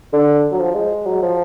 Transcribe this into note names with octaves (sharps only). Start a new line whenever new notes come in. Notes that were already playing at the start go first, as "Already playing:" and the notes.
D3
F#3
F3
G#3
F#3
F3